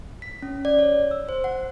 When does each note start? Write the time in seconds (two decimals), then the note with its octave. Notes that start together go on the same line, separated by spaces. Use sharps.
0.22 B6
0.42 C#4
0.65 D5
0.79 C#5
1.11 E6
1.29 C5
1.44 F#5